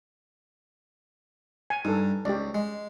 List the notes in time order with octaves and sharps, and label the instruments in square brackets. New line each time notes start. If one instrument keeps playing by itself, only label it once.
[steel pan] G#5
[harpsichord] G2 [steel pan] D#4 A4
[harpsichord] C#2 [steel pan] G4 D5
[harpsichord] G#3